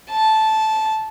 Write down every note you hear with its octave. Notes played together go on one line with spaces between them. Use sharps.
A5